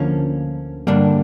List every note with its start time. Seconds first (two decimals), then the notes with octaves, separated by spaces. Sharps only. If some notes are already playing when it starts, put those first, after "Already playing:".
Already playing: D2 D3 F3 A#3 C#4
0.87 G2 D3 G3 A#3 D4